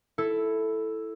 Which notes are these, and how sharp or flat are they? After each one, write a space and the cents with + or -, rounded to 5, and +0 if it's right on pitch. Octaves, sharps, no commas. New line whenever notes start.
E4 +0 A4 +0